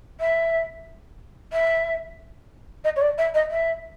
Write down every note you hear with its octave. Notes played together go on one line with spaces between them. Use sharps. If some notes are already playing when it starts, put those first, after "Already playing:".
E5
E5
D#5
C#5
D5
E5
D#5
E5